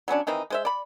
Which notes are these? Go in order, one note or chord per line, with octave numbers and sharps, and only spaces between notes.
F#3 B3 C#4 D4
D#3 E3 C4 D#4
G#3 C5 E5
D5 B5